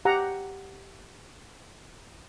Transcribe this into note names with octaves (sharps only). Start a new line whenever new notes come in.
G4 F#5 A#5